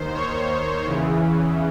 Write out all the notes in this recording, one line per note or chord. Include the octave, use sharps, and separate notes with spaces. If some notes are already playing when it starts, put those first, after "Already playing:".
Already playing: D#2 D#3 C5
C#5
E2 C#3 E3